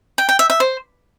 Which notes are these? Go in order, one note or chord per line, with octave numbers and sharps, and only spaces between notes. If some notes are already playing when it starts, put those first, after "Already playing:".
G5
G5
E5
E5
C5